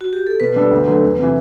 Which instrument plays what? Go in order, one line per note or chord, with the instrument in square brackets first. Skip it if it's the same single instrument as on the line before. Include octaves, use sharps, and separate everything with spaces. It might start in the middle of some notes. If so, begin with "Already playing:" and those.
[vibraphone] F#4
G4
A4
[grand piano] B2 [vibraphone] B4
[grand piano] G3 D4 A4
D2
D3 F#3 A3
E2
C3 E3